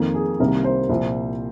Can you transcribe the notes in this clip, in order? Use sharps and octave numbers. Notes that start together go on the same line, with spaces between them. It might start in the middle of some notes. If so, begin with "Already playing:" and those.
Already playing: F2 D#3 A#3
G#4
C2 C3 D#3 G3 A#3 A#4
C5
C2 A#2 F3